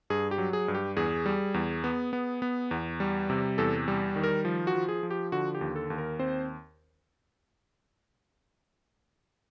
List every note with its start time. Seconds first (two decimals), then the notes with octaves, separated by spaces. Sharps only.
0.10 G2 G#4
0.31 G4
0.38 F#3
0.53 G#4
0.68 G2
0.74 G4
0.97 E2 G#4
1.26 G3
1.54 E2
1.84 B3
2.13 B3
2.42 B3
2.71 E2
3.00 G3
3.30 C3
3.58 E2 A4
3.88 G3
4.16 D#3
4.24 A#4
4.45 F3
4.67 F#4
4.74 F3
4.88 G#4
5.03 F3
5.10 G4
5.32 D3 F#4
5.55 G4
5.61 D#2
5.76 A4
5.90 D#2
5.98 A#4
6.19 C4 C5